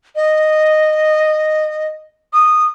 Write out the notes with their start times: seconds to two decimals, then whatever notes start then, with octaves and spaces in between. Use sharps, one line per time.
0.15 D#5
2.33 D#6